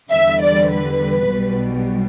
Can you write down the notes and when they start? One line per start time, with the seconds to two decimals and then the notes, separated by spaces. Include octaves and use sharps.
0.11 E2 D3 G3 E5
0.40 D5
0.70 B4
1.29 B1 B2 G3